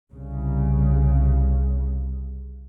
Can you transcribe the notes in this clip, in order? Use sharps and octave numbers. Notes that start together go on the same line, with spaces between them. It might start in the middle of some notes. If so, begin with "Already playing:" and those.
C2 C#3